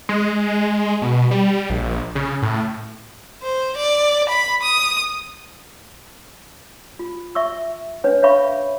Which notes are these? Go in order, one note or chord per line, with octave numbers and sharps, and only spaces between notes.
G#3
B2
G3
G3
A#1
C#3
A2
C5
D5
B5
D#6
F4
E5 C#6 E6
C#4 D4 B4 C#5
C#5 E5 F5 B5 C#6